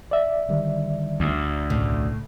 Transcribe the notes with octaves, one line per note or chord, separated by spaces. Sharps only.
D5 E5
D3 D#3 G3
D2
B1 A2 C#3